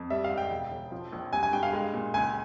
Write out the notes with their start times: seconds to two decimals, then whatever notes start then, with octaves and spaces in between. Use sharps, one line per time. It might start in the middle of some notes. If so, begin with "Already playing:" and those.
Already playing: F2
0.10 G3 E5
0.24 F5
0.30 G#2
0.38 G5
0.51 E1
0.71 E1
0.92 F3
1.12 A#1
1.33 G2 G#5
1.43 G#5
1.53 G2 G5
1.63 F5
1.73 G#3
1.93 A#2
2.14 C#2 G#5